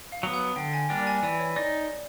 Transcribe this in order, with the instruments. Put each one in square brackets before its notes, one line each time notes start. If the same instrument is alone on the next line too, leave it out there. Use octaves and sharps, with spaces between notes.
[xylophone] F5
[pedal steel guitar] F#3 B3
[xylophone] F#5
[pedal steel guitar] D3 [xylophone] G5
[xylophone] G#5
[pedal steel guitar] G3 A#3 D4 [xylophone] G5
[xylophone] G#5
[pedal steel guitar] E3 [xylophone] D5
[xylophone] C#5
[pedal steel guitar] D#4 [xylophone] D5